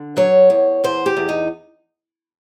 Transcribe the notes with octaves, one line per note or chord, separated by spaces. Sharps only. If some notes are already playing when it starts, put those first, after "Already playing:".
Already playing: D3
F#3 C#5
E2
E2 C5
G4
E2
D#4